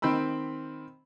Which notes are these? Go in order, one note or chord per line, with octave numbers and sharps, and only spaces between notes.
D#3 C4 G5 B5 E6